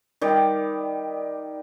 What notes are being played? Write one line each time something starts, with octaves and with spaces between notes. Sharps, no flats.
D#3 G3 D5